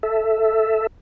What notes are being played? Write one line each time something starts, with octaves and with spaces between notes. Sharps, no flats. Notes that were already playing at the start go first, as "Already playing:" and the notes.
A4 E5